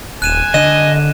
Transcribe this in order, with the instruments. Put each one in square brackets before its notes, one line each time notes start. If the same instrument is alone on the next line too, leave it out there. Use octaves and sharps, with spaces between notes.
[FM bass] D#1 [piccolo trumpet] G#5 [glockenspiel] F#6 D#7 E7
[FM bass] D3 [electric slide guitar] D#5 [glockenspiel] E7